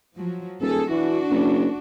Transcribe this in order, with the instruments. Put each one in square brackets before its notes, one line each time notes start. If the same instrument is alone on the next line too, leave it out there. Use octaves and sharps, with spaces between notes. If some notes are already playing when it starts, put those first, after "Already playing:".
[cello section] F3 F#3
[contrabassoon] D#1 [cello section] G#4 A4
[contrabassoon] E3 [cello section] D4 F#4
[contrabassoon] F#1